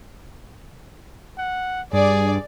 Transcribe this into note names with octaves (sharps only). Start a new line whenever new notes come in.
F#5
G2 G#4 D5